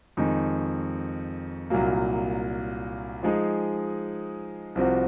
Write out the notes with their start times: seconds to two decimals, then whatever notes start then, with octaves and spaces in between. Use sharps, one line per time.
0.17 F2 D#3 G#3 D#4
1.70 C2 A#2 F#3 A#3
3.23 F3 G#3 D#4 G#4
4.75 C2 C3 F3 C4 F#4